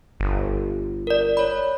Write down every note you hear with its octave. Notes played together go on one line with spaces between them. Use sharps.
G1
A#4 D5
C#5 B5